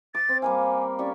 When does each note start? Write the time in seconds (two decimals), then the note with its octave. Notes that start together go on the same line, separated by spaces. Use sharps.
0.15 D6 A6
0.29 C4
0.42 G3 A#3 F5 G#5
0.99 C#4 G4 D5 C#6